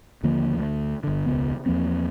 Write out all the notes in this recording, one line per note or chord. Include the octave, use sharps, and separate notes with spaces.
D#2 D3 F3 A#3
D2 A3
G1 D3
E1 C#2 C#3 B3
E2 F3 A#3 C4